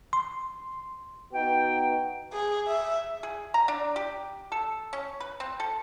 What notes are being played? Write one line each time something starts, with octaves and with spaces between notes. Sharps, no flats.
C6
B3 D#4 F#4 G5
G#4
E5
G#4
A#5
D4
G4
A4
C#4
B4
C4
A4